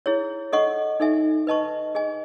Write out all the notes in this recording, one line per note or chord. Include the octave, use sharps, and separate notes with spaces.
E4 G#4 C#5
A4 D#5 F#5 C#6
D#4 A4 E5 G#5
B4 D#5 A5 C#6
G#4 D#5 G#5